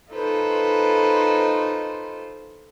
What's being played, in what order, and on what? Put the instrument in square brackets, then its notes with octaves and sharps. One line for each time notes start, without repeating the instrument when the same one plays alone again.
[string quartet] D#4 F4 A4 B4 C5